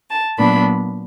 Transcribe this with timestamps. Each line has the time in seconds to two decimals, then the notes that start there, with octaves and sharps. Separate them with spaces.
0.10 A5
0.38 A#2 F#3 B3 D4 B5